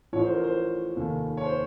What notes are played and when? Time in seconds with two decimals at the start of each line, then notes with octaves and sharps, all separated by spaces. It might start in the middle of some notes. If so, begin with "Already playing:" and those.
0.13 A1 A2 F3 C#5
0.23 C5
0.33 A#4
0.44 C5
0.96 F1 D#2 D#3
1.37 C#5
1.45 C5